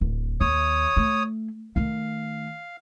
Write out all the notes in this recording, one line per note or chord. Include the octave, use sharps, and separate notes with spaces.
D1
D#2 C#5 D#6
A3
D#3 A3 F5